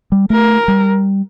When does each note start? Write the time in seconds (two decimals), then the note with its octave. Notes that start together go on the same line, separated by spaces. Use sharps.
0.12 G3
0.30 A3 A#4
0.68 G3